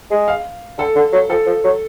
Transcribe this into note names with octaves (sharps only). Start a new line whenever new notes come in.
G#3
F5
D3 A4
D3
F#3
F3 A4
F3
F#3